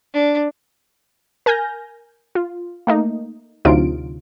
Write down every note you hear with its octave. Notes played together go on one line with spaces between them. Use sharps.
D4
A#4 G#5 F6 G6 A#6
F4
A3 A#3 D#4
D2 C3 F#3 D#4 F4 D7